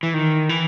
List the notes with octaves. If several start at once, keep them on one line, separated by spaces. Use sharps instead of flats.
E3
D#3
E3